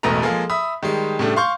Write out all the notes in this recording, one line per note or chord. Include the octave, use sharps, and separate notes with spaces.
E1 A1 B2 A3 A#5
F3 G#3 A#3 G#4 A4
E5 B5 D#6
D#3 G3 G#3
A2 C#3 G3 A3 D4
F5 C6 C#6 G6